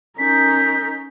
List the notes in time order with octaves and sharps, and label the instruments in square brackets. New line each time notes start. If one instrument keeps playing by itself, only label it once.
[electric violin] C#4 G6 [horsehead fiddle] D#4 A#4 [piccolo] B6